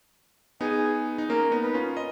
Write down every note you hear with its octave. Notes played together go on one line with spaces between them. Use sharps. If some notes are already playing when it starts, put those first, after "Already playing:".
B3 D#4 G#4
D#4
A#3 C#4 A#4
B3 D#4
B4
C#4 F4
D#5